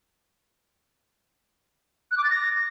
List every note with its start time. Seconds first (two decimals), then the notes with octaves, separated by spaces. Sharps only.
2.11 F#6
2.18 D6
2.24 A6
2.30 A#6